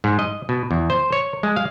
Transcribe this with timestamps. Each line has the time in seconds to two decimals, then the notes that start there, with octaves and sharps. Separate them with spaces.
0.04 G#2
0.19 D#5
0.49 B2
0.71 E2
0.90 C5
1.12 C#5
1.43 G#3
1.56 F5